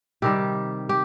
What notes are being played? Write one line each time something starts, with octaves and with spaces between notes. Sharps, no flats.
C3 D#3 G3 G4
G4